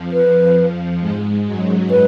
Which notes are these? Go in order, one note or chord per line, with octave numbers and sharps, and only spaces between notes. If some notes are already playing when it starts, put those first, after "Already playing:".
Already playing: F2 F3
B4
G#2 G#3
F#2 F#3
B4